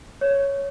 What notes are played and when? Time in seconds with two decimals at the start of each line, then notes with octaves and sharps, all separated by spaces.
0.21 C#5